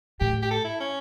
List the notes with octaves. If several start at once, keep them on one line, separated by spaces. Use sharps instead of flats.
A2 G4
G4
A4
E4
C#4